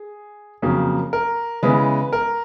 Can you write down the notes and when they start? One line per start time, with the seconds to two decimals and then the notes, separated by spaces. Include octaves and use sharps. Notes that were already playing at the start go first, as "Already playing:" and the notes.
Already playing: G#4
0.62 F2 C#3 F#3 A#3
1.13 A#4
1.63 C#3 E3 G#3 B3 B4
2.13 A#4